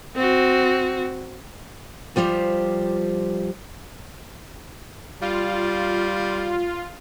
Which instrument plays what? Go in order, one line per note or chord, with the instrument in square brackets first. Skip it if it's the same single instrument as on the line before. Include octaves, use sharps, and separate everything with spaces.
[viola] C4 F#4
[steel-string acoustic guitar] F3 G3 F4 G4 C5
[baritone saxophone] G3 [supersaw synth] F4